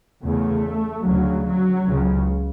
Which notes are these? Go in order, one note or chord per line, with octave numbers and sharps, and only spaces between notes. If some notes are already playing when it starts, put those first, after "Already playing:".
E2 C#3 A3
D2 C#3 F#3
F#3
C#2 C#3